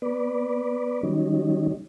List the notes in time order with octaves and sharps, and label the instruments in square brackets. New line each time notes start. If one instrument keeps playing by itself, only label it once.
[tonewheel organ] B3 B4 D5
D#3 F#3 G3 C#4 D#4